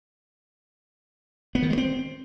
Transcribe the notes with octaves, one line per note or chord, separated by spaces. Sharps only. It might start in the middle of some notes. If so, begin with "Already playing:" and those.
B3
D#3
G#3
C4